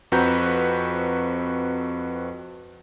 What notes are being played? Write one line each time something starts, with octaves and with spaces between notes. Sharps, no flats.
F2 C4 F#4 B4 A#5 G6